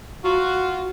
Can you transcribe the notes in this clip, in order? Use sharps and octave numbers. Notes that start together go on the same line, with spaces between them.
F4 F#4